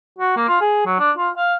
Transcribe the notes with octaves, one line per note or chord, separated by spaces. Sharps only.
F#4
A#3
F4
G#4
F#3
D4
F4
F5